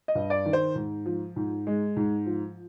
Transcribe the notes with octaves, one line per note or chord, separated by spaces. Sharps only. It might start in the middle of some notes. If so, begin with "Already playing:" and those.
D#5
G2
D5
D#3
C5
G#2
F3
G#2
G#3
G#2
F3